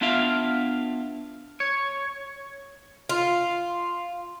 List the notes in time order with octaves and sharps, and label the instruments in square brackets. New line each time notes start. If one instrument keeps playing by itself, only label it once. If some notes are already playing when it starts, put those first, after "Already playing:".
[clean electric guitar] B3 D4 F4 E5 F5
C#5
[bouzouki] F4